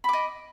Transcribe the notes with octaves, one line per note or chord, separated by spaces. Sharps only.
D#5 B5 D6